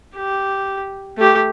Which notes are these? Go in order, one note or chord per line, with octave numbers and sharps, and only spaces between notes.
G4
A3 G4